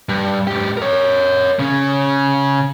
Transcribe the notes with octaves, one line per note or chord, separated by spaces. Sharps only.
G2
G#2 G4
A#4 C#5
C#3 C#4